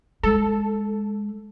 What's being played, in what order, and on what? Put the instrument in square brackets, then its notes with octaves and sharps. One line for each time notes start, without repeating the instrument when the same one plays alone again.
[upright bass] G#3 [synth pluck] A4